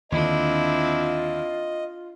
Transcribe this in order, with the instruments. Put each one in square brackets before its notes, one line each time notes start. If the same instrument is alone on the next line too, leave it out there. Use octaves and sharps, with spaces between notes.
[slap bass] D#2 D3 [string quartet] C4 D4 E4 [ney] F4 [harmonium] D#5